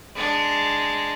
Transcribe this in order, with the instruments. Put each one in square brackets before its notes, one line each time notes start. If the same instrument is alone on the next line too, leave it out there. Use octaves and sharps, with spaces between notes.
[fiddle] G#3 D4